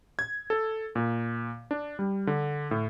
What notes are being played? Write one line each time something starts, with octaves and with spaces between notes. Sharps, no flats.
G#6
A4
A#2
D4
G3
D3
A2